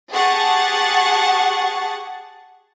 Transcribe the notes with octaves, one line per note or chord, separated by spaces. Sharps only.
G4 G#4 F#5 A5 C#6 A6